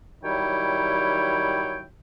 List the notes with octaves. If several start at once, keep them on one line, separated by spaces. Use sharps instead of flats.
D#3 F#3 G3 E4 C#5 G5